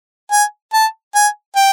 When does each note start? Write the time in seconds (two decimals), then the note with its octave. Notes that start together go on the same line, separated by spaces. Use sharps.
0.32 G#5
0.73 A5
1.15 G#5
1.56 G5